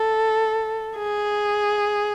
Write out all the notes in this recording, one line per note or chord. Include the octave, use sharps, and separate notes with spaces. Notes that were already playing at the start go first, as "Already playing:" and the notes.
Already playing: A4
G#4